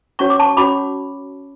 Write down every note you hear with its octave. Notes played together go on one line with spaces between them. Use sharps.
C#4 F#4 C#5 C#6
D6
A5 C#6
C#4 F#4 C#5 B5 D6